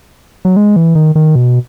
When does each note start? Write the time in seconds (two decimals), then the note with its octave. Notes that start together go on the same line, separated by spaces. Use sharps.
0.45 F#3
0.56 G#3
0.76 E3
0.95 D#3
1.15 D#3
1.35 B2